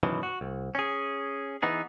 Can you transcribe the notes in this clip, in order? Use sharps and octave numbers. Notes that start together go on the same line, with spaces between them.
F#2 B2 D#3 E3
F#4
C2
C#4 G#4
E3 B3 D#4 G#4